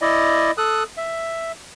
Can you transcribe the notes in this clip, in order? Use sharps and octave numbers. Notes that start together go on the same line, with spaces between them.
E4 D5 D#5
A4 D#6 F#6
E5